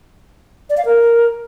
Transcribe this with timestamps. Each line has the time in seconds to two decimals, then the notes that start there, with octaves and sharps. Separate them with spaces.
0.70 D5
0.77 F5
0.85 A#4